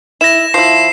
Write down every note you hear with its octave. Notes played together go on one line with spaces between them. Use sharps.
E4 A#6 E7
F3 E4 C7